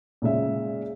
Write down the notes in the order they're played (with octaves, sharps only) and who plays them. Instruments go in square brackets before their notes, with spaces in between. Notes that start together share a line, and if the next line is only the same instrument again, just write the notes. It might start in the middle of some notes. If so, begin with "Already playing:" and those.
[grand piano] A#2 C#3 G#3 E5